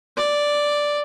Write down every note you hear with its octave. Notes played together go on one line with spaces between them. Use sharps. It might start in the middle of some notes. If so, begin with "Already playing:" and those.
D5